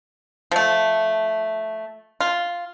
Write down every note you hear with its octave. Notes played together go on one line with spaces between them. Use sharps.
F3 A3
F4